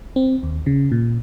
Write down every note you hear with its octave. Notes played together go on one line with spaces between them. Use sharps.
C4
D#2
C#3
A#2